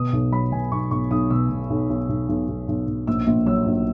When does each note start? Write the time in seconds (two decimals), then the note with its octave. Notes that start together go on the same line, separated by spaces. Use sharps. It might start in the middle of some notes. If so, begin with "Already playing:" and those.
Already playing: B2 D#6
0.13 B1
0.32 F#3 B5
0.52 B2 G#5
0.72 B1 C#6
0.91 B1 C#6
1.11 B1 D#6
1.30 B2 E6
1.50 B2
1.70 B1
1.90 B1
2.09 B1
2.29 B1
2.48 B1
2.68 B1
2.87 B1
3.07 A#1 E6
3.27 A#1
3.46 F#3 E6
3.66 A#1